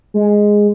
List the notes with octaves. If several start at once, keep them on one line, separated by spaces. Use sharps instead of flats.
G#3